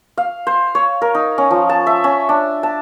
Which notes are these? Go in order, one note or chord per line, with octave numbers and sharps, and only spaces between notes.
F5
C5
C#5
A#4
D#4
C#4
F3
A5
E5
C#4
D4
A5